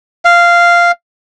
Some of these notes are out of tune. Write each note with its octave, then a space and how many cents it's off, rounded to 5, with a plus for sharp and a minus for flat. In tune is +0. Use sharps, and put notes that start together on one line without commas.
F5 -10